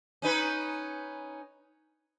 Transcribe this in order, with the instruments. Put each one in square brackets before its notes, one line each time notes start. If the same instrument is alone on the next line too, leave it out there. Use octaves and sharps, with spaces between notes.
[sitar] C#4 D#4 B4